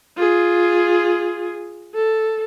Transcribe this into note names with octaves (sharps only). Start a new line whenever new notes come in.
F4 G#4
A4